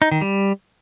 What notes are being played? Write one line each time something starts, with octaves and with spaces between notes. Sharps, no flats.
D#4
D#3
G3